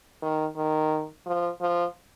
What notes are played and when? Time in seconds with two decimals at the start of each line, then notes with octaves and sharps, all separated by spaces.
0.22 D#3
0.56 D#3
1.26 F3
1.61 F3